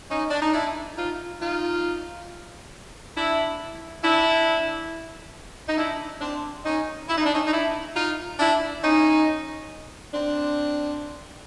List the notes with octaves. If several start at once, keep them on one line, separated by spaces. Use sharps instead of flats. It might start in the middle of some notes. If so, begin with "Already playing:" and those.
C#4 D#4
D4
D#4
D4 E4
D#4 F4
D#4 F4
D4 E4
D4 E4
D#4
D4 E4
C4 D4
C#4 D#4
E4
D#4
D4
C#4 D#4
D#4
D4 E4
D#4 F4
D4 E4
C#4 D#4
C4 D4